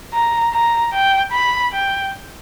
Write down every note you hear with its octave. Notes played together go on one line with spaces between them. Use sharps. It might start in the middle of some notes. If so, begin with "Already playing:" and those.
A#5
A#5
G5
B5
G5